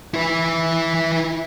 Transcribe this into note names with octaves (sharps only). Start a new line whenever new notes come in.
E4 B4